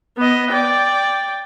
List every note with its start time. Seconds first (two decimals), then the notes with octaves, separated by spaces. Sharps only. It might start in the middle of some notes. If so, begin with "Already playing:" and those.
0.17 B3 D#5
0.51 D5 G5